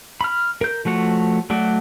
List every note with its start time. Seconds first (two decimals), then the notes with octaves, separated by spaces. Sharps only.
0.21 B5 F6
0.61 A#4 G6
0.85 F3 A3 F#4 C#5
1.50 F#3 A3 F#4 D5